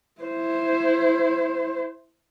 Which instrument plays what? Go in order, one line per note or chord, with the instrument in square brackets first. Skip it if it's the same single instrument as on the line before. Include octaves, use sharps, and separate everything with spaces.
[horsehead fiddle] E4 C5